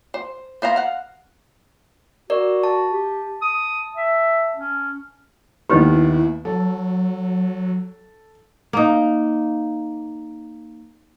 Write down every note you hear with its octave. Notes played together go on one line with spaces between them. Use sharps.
C5
B3 C5 F5 A#5
F5 F#5
F#4 A#4 D5
A5
G4
D#6
E5
C#4
D#2 B3 E4 G4 B4 D#5
F#3 A4
A#3 D#4